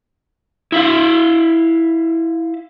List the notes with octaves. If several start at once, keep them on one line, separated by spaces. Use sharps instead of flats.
E4 E5 F5